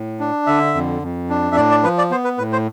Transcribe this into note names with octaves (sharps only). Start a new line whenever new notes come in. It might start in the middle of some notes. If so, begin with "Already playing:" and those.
Already playing: A2
D4
D3 E5
F2
F2
D4
E5
A2 D5
D5
F3 B4
D5
B3 C5
B4
A2 B4
C5